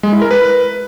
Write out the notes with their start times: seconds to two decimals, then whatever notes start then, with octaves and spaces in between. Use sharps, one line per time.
0.03 G#3
0.12 E4
0.22 A#4
0.31 B4